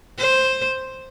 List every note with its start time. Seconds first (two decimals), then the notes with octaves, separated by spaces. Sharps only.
0.18 C5